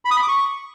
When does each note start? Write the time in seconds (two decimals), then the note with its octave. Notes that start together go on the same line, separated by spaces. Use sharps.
0.05 B5
0.11 D#6
0.17 B5
0.22 D6
0.28 C#6